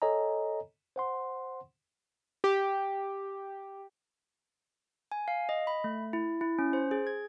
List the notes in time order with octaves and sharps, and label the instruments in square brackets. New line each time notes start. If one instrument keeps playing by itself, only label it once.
[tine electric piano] A4 C#5 D#5 G#5 A#5
C5 F#5 C6
[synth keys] G4
[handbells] G#5
F5
D#5
B5
A3
E4
E4
C#4
C5
G#4
G#6